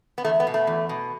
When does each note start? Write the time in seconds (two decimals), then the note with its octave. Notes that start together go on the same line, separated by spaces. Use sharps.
0.18 B3
0.25 E2 A3
0.40 B3
0.47 B2
0.54 A3
0.67 E2
0.89 B2